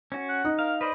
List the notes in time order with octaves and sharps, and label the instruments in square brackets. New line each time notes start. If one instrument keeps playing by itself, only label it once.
[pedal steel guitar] C#4 F#4
[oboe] F#5
[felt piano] D#4
[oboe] A#4 [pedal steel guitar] F5
[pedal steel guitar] B4 C5 D5 [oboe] D#5